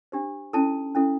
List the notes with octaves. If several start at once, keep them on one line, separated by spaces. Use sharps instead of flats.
D4 G4 C5
C#4 E4 A4 A5
C#4 E4 A4